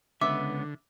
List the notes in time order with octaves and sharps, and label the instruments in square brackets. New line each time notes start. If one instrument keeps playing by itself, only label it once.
[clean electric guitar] C#2 B3 [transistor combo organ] D3 [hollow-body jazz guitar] E5 [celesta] D6